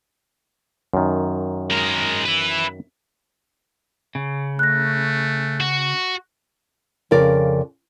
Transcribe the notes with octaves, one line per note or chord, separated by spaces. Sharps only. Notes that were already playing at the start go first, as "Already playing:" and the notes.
F#2 D#3
G#3 A#4
E4 B4
C#3
A3 F#6 A#6
F#4
F2 C#3 A#4 D5